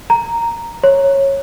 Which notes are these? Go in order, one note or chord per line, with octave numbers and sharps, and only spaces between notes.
A#5
C#5